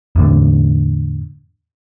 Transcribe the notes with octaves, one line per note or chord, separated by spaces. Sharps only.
E2 A2 D3